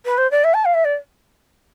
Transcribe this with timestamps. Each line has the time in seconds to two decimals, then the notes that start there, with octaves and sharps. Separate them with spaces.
0.05 B4
0.18 C5
0.31 D5
0.44 E5
0.54 A5
0.65 F5
0.74 E5
0.85 D5